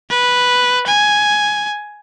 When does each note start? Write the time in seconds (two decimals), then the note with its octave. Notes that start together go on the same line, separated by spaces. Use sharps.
0.10 B4
0.87 G#5